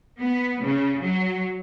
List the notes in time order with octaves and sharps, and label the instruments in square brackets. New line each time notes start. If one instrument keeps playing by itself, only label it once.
[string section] B3
C#3
F#3